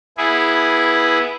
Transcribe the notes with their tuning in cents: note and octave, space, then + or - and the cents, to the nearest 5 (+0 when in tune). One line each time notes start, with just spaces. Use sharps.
B3 -10 E4 +0 G#4 +0